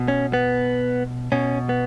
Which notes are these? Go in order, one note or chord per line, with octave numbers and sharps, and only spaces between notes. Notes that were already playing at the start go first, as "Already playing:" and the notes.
Already playing: B2
C#4
B3
B2 C#4
B3